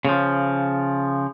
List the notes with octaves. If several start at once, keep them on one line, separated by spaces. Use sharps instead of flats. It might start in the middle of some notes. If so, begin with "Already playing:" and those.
C#3 F3